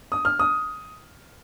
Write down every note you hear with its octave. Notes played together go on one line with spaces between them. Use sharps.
D#6
F6
D#6